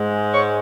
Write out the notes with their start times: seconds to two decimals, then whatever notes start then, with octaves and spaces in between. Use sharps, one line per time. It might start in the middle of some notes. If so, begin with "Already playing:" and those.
Already playing: G#2 G#3
0.32 C#5